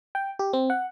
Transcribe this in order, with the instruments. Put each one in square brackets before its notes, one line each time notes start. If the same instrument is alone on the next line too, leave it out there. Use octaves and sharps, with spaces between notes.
[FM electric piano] G5
G4
C4
F#5